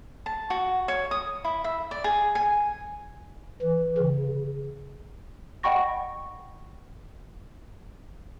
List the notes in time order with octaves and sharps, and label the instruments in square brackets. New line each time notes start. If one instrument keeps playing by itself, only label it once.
[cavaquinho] A5
F#4
C#5
D#6
E4
E5
D5
G#4
G#5
[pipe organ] E3
C#3
[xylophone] D#5 F#5 G5 B5 C#6 A#6